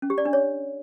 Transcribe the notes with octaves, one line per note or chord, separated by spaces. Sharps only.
C#4
G4
D5
D4
C#5